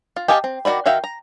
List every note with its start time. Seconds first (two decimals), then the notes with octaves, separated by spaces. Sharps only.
0.16 F4
0.28 G4 D#5 F5 G#5 A5
0.44 C4
0.65 D#3 D#4 F#4 D5 B5
0.86 D#3 F#4 E5 F5 G5
1.04 A#5